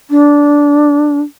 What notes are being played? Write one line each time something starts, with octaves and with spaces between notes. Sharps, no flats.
D4